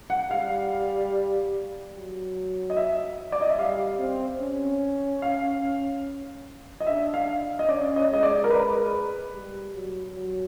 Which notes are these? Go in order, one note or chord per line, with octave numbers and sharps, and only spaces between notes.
F#5
G3 F5
F#3
D#5
E5
D5
D#5
E5
G3 F5
C4
C#4
F5
D#5
D4 E5
F5
D#5
C#4 D5
D#5
G#3 D#5
D5
A#4
B4
G3
F#3
F#3